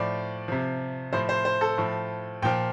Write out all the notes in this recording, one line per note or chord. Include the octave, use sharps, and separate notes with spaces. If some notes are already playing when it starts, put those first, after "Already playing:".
Already playing: A2 F3 D5
C3 F3
A2 F3 C5
C5
C5
A4
A2 F3
A#2 F3 G5